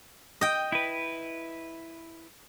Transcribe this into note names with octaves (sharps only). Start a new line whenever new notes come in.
D#5 G5
E4 B4